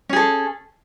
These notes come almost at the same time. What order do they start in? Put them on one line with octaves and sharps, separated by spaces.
C#4 G#4 A4